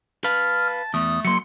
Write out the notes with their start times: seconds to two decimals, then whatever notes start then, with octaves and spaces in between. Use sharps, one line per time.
0.24 B4 F5 A5 F6
0.94 E2 A3 D#6
1.25 F#3 A#3 C6 C#7